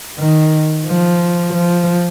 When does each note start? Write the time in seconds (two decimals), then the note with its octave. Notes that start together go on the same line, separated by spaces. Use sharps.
0.19 D#3
0.86 F3
1.54 F3